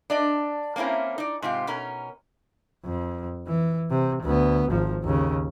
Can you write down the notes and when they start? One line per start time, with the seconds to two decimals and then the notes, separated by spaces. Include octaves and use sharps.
0.10 D4 D5 D#5
0.76 A#3 C4 C#4 E4 A#4
1.18 D#4 D5
1.42 G#2 C3 F4 G4
1.67 B2 C#4 D#4 A#4
2.85 F2
3.47 E3
3.90 C3
4.23 D2 B3
4.70 G#1 F3
5.04 D#2 C#3